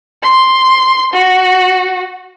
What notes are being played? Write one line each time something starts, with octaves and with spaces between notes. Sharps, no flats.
C6
F#4